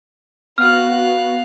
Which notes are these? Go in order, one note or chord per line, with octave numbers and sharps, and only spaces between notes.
B3 F#4 F5 F6 F#6